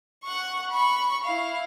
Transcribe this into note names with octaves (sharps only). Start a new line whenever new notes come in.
F#5 C#6
B5 C#6
E4 F5